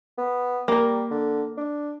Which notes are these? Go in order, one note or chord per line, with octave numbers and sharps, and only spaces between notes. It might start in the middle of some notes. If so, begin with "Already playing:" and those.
B3
G3 A#3 A#4
D3
D4